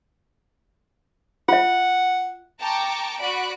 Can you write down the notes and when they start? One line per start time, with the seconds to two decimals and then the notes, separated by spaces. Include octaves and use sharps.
1.49 F4 E5 F#5
2.60 G5 A5 A#5 C#6 D6
3.20 F#4 D5 B5 F#6 D7